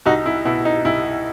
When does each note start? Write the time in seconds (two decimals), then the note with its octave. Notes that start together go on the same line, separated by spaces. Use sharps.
0.06 C2 D#4 F#4
0.26 E4
0.45 B2 E4
0.65 D#4
0.85 C2 E4